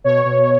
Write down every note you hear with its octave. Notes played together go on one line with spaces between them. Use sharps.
B2 C#5
B2